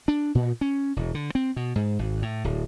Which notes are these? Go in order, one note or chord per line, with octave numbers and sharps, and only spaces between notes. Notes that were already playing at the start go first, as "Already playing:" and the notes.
D4
A#2
C#4
E1
D3
C4
B2
G#2
G#1
A2
D1